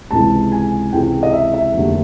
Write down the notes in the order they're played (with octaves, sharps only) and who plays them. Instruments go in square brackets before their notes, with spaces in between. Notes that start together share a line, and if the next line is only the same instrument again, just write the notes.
[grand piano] C#2 C3 E3 G#3 A5
G#5
C#2 C3 E3 G#3 G5
D#5
E5
E5
F1 D#2 D3 F#3